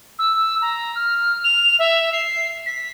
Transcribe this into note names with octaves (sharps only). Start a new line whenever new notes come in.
E6
A#5
F6
F7
E5
C7
B6